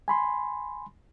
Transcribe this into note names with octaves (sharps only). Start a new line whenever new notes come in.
G#5 B5 C6